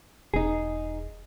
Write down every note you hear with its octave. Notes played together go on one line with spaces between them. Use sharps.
E1 D#4 G#4